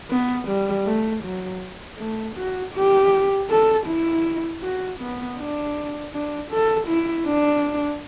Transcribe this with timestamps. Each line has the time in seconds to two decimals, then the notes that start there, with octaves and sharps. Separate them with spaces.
0.11 B3
0.48 G3
0.86 A3
1.24 F#3
1.99 A3
2.36 F#4
2.74 G4
3.50 A4
3.87 E4
4.63 F#4
5.00 B3
5.38 D4
6.13 D4
6.51 A4
6.88 E4
7.27 D4